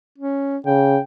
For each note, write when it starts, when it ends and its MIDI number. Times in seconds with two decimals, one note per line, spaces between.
0.18 0.57 61
0.66 0.98 49
0.66 1.01 79